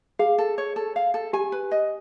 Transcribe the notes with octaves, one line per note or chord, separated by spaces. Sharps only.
G#4 F5
A4
C#5
A4
F5
A4
G4 G#5
B4
D#5